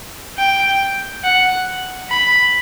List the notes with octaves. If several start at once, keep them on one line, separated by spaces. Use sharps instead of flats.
G5
F#5
B5